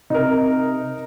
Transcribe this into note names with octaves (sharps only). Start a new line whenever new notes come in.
C3 D#4 A#4